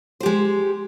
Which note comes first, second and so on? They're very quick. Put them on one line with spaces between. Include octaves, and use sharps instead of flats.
C5 G4 G#3